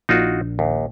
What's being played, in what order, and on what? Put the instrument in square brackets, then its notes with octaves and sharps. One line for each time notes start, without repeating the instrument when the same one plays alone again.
[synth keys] A#1 [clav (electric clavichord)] D#4 F4 F#4
[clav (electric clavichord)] D#2